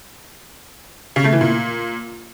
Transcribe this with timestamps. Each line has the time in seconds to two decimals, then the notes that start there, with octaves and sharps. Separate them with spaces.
1.16 C#3
1.24 A3
1.33 E3
1.41 A#2